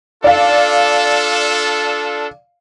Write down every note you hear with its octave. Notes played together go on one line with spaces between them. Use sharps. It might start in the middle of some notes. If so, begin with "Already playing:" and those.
D4 F4 A4 D5 F5